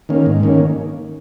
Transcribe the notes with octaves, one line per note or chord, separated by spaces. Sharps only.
D#3 A#3 C#4
G#2
D#3 A#3 C#4